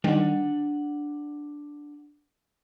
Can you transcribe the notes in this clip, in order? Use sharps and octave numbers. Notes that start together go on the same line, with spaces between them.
D#3 G3 D4 F#5